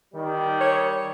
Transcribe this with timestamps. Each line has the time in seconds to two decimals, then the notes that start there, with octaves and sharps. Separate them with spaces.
0.14 D#3 G3
0.61 C#5